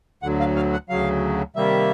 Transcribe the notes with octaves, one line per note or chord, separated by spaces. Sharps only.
D2 D3 F#3 F#5
F5
F5
F#5
D2 C#3 F#3 F5
C3 D#3 G3 A#3 E5